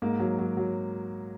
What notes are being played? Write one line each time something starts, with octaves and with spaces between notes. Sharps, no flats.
G#2 A#3
F#3
F#3
F#3